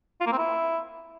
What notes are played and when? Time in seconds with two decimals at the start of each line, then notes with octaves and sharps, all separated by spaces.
0.21 F4
0.26 A#3
0.32 C4
0.38 E4